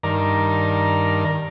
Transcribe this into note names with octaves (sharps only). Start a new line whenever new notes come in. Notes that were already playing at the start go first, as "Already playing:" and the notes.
G2 D#3 A#4 D5 A#5